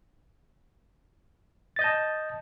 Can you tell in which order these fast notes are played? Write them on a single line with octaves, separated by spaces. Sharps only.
A6 D#5 G6 A5